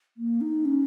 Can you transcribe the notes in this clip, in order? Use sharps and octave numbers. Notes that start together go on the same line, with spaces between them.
A#3
D#4
C#4